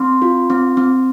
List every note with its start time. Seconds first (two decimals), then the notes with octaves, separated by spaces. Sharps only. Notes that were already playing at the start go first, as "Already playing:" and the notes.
Already playing: C4 C6
0.22 F4
0.50 C4
0.77 C4